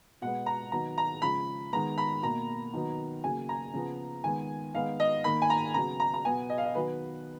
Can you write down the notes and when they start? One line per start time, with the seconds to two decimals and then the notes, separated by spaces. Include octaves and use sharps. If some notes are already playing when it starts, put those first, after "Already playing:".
0.22 B2 G#3 B3 F#5
0.46 A#5
0.72 D#3 F#3 B3 A#5
0.98 A#5
1.22 C#3 F3 G#3 B5
1.72 D#3 G#3 B3 A#5
1.98 B5
2.22 B2 A#3 A#5
2.74 D#3 F#3 B3
3.24 C#3 F#3 A#3 G#5
3.49 A#5
3.73 C#3 F3 B3
4.24 D#3 G#3 B3 G#5
4.74 D#3 G#3 B3 F5
5.00 D#5
5.24 D#3 A#3 B5
5.42 G#5
5.50 A#5
5.74 C#3 F#3 B3 A#5
6.00 A#5
6.14 A#5
6.25 B2 F#3 B3 G#5
6.50 D#5
6.58 F5
6.66 D#5
6.75 D#3 F#3 B3 B4